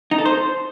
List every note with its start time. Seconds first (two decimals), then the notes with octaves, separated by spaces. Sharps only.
0.11 D#4
0.18 A4
0.25 C5